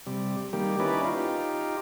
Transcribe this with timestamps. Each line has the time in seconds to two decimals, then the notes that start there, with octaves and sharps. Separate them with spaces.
0.07 C3 G3
0.53 D#3 G3 A#3 G4
0.80 C#4 D#4 E4 B4 D5
1.04 D#4 F4 G4